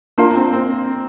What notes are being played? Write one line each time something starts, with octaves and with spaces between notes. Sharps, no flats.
A#3 D4 F4 A#4 F5
C4
C4